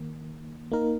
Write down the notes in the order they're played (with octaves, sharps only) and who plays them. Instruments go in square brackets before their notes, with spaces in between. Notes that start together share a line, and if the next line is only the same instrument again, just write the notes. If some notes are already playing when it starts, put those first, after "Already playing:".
Already playing: [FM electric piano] D#3 A#3
A#3 D#4 A#4